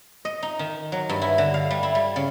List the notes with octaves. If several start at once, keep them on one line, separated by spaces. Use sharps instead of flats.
D#5
D#4
D#3
F#3
G2
E4
D3
F5
G3
E4
G3
C#3